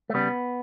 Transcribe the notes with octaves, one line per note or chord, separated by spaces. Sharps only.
A3
C#3 G3 B3